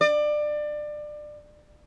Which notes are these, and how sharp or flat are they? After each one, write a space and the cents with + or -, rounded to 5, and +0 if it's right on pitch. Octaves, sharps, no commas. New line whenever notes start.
D5 +25